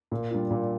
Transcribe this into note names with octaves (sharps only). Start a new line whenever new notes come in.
A#2
G3 D4 F4
A#2